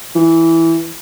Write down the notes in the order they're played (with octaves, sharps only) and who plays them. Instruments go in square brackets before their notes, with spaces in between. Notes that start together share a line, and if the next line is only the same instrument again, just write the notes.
[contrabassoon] E3